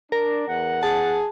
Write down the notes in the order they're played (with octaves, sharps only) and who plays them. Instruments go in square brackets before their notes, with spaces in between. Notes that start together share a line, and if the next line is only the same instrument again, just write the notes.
[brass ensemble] D4 [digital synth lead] A#4
[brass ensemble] E2 F#5
[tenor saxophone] G#4 [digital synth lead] A5